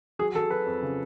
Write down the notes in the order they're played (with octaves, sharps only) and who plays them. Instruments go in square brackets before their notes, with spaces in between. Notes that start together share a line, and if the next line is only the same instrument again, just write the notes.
[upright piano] F#3 G#4
F#3 A4
F#3 B4
F2
C#3